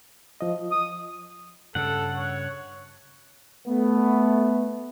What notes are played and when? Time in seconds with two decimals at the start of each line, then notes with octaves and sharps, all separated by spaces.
0.41 F3 D#5
0.71 D#6
1.75 G2 C#3 A4 F#5
2.16 C#5
3.68 A3 B3